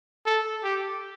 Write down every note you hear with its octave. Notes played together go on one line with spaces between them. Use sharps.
A4
G4